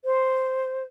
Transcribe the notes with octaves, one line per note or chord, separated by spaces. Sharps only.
C5